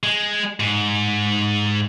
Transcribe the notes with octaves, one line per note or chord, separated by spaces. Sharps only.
G#3
G#2